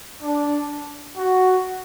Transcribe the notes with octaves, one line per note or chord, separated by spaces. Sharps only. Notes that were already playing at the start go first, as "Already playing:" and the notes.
D4
F#4